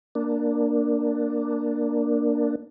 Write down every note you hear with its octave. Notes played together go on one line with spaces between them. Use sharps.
A#3 D4